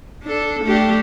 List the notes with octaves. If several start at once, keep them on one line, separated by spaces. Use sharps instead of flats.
D4 A4
A3 D4 G4